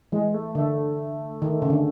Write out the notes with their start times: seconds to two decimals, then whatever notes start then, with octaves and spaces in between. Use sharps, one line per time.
0.12 E3 G#3
0.34 A3
0.55 D3 A3
1.42 D#3
1.62 C#3
1.70 D3